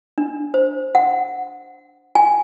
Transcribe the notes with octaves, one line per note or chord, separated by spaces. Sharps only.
D4
C5
F#5
G#5